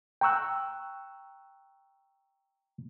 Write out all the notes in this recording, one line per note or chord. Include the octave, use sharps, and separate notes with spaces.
G5 A#5 C#6 E6 F#6